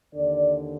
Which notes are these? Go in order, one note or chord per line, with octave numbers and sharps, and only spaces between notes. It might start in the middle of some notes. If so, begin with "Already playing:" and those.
D#2 D3 D5